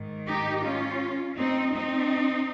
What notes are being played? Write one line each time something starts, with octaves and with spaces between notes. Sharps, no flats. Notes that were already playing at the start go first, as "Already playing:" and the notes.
Already playing: G#2 D#3
D#4 G4
C#4 F4
C4 D#4
C4 D#4